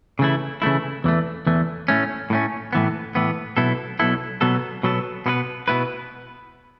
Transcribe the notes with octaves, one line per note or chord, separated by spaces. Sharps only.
C#3 E3 A3 E4
C#3 E3 A3 E4
E2 E3 A3
E2 E3 A3
A2 A3 C#4
A2 A3 C#4
A2 E3 B3
A2 E3 B3
B1 B2 B3 E4 A4
B1 B2 B3 E4 A4
B2 F#3 B3 A4
B2 F#3 B3 A4
B2 B3 E4 B4
B2 B3 E4 B4